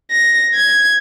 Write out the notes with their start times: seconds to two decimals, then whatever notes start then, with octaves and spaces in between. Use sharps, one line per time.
0.12 A#6
0.55 G#6